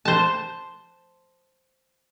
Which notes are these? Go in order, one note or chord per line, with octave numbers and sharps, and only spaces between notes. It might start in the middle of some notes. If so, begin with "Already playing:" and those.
C5 A5